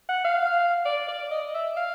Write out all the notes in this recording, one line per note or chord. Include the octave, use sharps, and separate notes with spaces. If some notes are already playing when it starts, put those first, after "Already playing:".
F#5
F5
D5
D5
D#5
E5
F5